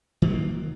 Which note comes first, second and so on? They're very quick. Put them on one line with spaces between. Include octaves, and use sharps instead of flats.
D#3 F#3 A#3